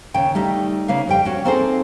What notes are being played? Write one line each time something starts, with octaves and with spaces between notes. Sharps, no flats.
D#2 C#3 G5
G3 A3 D#4
C#3 A#3 B4 F5
F2 G3 G5
C#4 F#4
A#3 C4 D#4 G#4 A4 C5